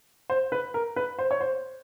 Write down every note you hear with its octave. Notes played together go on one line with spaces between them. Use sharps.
C5
B4
A#4
B4
C5
C#5
C5